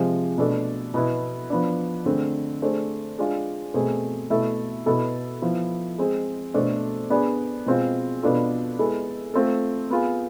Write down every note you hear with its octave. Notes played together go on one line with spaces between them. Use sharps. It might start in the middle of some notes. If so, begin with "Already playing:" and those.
Already playing: C3 F3 G#3 C4
B2 A3 D4 A4
B2 B3 E4
F3 B3 D4
D3 A3 C4 G#4
A3 D4 G#4 C5
G#3 D4 F4
B2 A3 C4 G#4
B2 A3 E4 A4 E5
B2 B3 E4 A4
F3 B3 E4
G#3 C4 G#4
B2 A3 D4 A4 C5
B3 D4 G#4 D5
B2 G#3 C4 F4
B2 B3 D4 F4 A4
G#3 B3 E4 A4
A3 C4 F4 A4
B3 F4 G#4